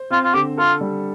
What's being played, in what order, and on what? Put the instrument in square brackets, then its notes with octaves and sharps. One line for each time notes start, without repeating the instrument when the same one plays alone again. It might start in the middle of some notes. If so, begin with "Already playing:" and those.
Already playing: [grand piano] C5
[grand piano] C4 [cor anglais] F4
[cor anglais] F4
[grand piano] D3 [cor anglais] G4
[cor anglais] F4 [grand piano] A4
[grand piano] G3